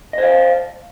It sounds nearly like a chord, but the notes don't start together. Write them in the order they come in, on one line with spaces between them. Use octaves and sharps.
D#5 C5 F5